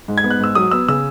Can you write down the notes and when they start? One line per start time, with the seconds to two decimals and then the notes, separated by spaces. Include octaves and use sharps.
0.08 G#2
0.18 G#6
0.24 B3
0.30 F#6
0.40 G#2 E6
0.55 F#3 D#6
0.71 B3 E6
0.88 C#3 E6